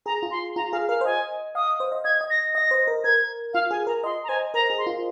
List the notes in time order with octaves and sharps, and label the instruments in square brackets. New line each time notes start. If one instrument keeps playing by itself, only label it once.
[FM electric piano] G#4 [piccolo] A#5
[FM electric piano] F4
[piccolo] C6
[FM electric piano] F4 [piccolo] A#5
[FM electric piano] G#4 [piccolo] F5
[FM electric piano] A#4 [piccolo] F5
[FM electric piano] C5
[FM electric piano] D#5 [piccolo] G#5
[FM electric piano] F5 [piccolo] D#6
[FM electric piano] C5
D#5
[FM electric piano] D#5 [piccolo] G#6
[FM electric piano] D#5
[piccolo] A#6
[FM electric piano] D#5 [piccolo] A#6
[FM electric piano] C5
A#4
[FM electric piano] A#4 [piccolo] G#6
[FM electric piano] F4 [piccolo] F5
[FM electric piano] G#4 [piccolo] G#5
[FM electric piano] A#4 [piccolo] A#5
[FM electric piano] D#5 [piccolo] C6
[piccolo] A#5
[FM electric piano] C5 [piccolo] G#5
[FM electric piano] A#4 [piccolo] A#5
[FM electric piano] G#4
[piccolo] C6
[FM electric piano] F4